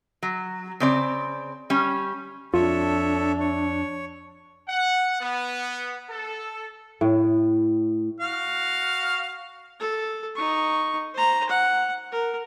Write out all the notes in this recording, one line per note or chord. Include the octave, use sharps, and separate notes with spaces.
F#3
C#3 C4 D5
G3 C#4
F2 D4 F4 A4 C#5 E5
C#5
F#5
B3
A4
A2
F#4 F5 F6
A4
D#4 C#6
C5 A#5
F#5
A#4